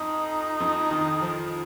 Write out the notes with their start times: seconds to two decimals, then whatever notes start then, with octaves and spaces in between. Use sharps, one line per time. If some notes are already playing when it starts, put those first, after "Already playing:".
Already playing: F2 D#4
0.60 F2
0.91 D#3
1.21 F3